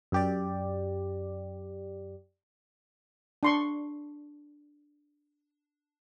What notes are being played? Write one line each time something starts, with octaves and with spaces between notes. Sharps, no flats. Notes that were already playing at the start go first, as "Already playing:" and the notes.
F#2 G4 D5
D4 C6 C#6